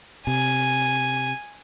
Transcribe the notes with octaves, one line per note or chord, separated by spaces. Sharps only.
C3 G#5